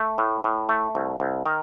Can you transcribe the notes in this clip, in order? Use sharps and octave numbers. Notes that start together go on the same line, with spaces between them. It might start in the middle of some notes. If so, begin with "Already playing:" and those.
Already playing: A3
A2
A2
A3
C2
C2
D#3 A#4